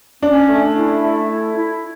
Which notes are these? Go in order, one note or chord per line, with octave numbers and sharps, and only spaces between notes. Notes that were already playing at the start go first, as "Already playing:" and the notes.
C#4 D4
A3
E4
A3
E4
E4